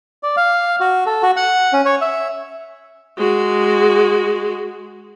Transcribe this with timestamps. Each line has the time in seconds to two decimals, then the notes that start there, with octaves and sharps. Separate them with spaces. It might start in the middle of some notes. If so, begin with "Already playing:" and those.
0.23 D5
0.37 F5
0.80 F#4
1.06 A4
1.23 F#4
1.36 F#5
1.73 C#4
1.86 C#5
2.01 E5
3.17 G#3 F#4